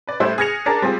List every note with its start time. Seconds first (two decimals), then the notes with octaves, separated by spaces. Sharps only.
0.07 B4 D5
0.20 A2 G3 E4 C5 E5 F#6
0.38 G#4 F6 G#6 A#6 C#7 F7
0.66 D4 G#4 A#4 A5
0.82 G3 C4 F4 G#4